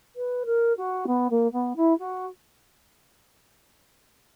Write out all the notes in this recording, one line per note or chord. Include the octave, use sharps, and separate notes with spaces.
B4
A#4
F#4
B3
A#3
B3
E4
F#4